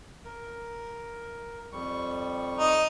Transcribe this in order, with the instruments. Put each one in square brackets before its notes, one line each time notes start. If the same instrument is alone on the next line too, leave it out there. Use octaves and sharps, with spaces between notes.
[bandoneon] A#4
F2 G3 C#6
[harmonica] D#4